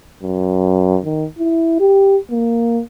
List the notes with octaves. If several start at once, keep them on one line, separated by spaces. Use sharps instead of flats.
F#2
D#3
E4
G4
A#3